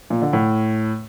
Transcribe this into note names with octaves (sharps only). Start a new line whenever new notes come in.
A#2
D3
A2